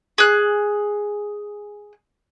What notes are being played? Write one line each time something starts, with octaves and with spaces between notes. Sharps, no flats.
G#4 F#6